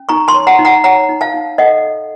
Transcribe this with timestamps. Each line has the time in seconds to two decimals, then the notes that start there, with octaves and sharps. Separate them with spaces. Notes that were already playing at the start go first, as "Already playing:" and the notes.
Already playing: C#4
0.09 D#4 A#5 C#6
0.28 A5 C6
0.34 C#5
0.47 F#5 A#5
0.59 D#4
0.65 F#5 A#5
0.84 C#5 F#5 A#5
1.09 D#4
1.21 F5 A5
1.34 D#4
1.58 A4 D#5 F#5